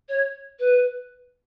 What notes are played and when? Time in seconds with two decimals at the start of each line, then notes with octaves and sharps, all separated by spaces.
0.09 C#5
0.59 B4